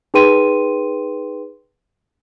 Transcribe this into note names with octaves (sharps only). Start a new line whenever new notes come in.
D#4 G#4 B4 G5 C6 D#7